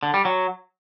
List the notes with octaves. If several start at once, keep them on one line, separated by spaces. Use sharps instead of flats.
D3
G3
F#3